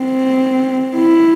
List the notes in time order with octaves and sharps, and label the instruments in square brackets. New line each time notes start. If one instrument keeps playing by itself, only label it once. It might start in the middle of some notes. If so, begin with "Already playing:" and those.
Already playing: [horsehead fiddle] C4
E4